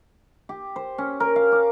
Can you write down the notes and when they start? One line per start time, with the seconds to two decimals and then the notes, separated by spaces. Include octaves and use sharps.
0.49 G4
0.76 C5
0.98 C#4
1.20 A#4
1.36 F5
1.52 D6